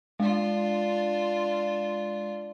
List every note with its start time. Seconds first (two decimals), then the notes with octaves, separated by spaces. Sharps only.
0.20 G#3 D4 F4